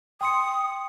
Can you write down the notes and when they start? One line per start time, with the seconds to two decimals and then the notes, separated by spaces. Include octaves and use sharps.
0.21 G5 C6 D#6 C#7